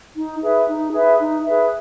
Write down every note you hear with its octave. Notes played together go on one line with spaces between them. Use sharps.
D#4
G#4 B4 E5
D#4
G#4 B4 E5
D#4
G#4 B4 E5